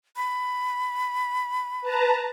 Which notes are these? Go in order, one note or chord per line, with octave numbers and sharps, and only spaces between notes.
B5
B4 A5 A#5